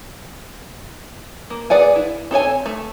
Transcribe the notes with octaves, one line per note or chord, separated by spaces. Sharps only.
A#3
G#4 B4 D5 F#5 G#5
E4
C4 A4 C#5 G#5
A3